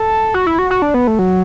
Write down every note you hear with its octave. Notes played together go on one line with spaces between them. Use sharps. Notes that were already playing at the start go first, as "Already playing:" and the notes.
Already playing: A4
F#4
E4
F#4
F#4
D4
B3
A3
F#3